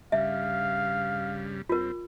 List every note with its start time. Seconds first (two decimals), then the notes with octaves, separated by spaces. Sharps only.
0.12 G2 C#3 G3 E5 F5
1.69 G2 C4 F4 A#4